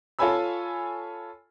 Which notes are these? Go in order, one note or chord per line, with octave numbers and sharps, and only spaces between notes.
F4 A4 C#5 G#5 B5 E6